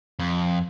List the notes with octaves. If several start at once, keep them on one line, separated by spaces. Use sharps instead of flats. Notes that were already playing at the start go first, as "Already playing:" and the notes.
F2